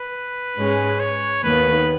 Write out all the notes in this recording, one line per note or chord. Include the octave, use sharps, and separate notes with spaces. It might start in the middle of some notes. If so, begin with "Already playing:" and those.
Already playing: B4
G#2 G#3 C#4 G#4
C#5
D#2 D#3 B3 B4